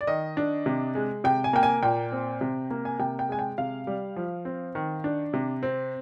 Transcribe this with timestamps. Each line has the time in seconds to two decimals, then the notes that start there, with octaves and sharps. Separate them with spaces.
0.01 D5
0.07 D#3 D#5
0.37 D4
0.66 C3
0.95 G#3
1.24 C3 G5
1.44 G#5
1.53 A#3 G5
1.63 G#5
1.83 A#2 G5
2.12 C4
2.41 C3
2.70 A#3
2.85 G#5
2.99 C3 G5
3.19 G5
3.29 G#3 G#5
3.39 G5
3.58 C3 F5
3.87 G3
4.16 F3
4.45 C4
4.75 D#3
5.04 D4
5.34 C3
5.63 C4